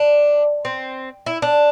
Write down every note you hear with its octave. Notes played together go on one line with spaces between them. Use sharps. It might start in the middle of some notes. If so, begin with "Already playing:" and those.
Already playing: D4
C4
E4
D4